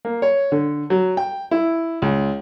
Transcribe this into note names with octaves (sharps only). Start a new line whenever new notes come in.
A#3
C#5
D3
F#3
G5
E4
C#2